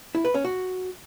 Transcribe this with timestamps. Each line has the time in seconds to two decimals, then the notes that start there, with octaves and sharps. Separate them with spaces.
0.15 E4
0.25 B4
0.35 C#4
0.44 F#4